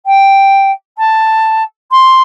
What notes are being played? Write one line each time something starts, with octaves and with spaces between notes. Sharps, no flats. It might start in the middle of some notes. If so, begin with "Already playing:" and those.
G5
A5
C6